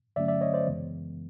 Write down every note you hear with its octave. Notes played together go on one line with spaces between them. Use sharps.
G2 D3 F#3 A3 C#4 D5 E5
D5 E5
C#5 D#5
C5 D5
F#2 C#3 E3 G#3 B3